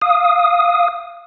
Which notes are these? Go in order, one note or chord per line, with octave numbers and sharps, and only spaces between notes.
F5 D#6